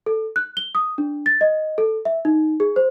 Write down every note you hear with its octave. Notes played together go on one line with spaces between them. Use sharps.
A4
F#6
G7
D#6
D4
A6
D#5
A4
E5
D#4
G#4
C5